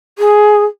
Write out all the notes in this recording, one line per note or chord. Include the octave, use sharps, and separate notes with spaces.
G#4